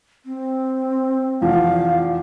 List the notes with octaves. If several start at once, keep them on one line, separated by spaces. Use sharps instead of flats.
C4
F1 E2 F3 F5